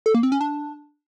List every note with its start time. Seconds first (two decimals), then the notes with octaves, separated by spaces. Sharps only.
0.06 A4
0.15 A#3
0.23 C4
0.32 C#4
0.41 D4